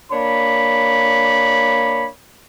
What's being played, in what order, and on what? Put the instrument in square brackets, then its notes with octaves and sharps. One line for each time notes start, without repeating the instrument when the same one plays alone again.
[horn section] A#3 D4 C#5 B5